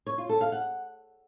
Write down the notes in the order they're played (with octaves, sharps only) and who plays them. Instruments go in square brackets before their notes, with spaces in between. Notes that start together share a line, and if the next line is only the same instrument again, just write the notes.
[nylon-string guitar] C#5
F4
A4
F5
F#5